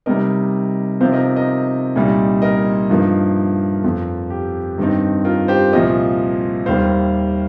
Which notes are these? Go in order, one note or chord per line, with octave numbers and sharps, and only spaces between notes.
C3 G3 A#3 D#4 A#4 D#5
C3 F3 C4 D#4 C5 F5
A#4 D#5
A#4 D#5
C2 A#2 G3 D#4
A#4 D#5
G2 F3 A#3 D#4
F2 F3 A#3
G4
G2 D#3 C4 D#4
F4 A#4
G4 C5
C2 A#2 F3 A#4 D#5
D#2 D#3 G3 A#3 C5 F5